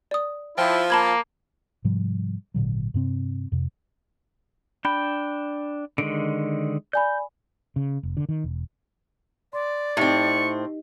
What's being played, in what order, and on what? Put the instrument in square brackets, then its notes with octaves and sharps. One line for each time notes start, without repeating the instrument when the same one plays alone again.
[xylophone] D5 D#6
[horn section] F3 [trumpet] E4 [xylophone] G5
[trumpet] A#3 [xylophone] A5 B5 G#6
[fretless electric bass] G#2 C3 F3 G3
G#1 A#2 D3 F#3
G2 C3 C4
F2 C3
[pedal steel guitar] D4 G5 [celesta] B5
[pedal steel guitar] D3 D#3 G#3 [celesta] D7
[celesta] D5 G#5 B5 [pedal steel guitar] G6
[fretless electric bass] C#3
F1
D3
D#3
E1
[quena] D5 [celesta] C6
[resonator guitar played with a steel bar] A2 C4 [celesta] D#4 G4 D#5 [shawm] C#6